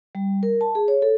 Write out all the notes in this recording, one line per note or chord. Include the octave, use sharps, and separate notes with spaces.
G3
A#4
A5
G#4
C#5
A4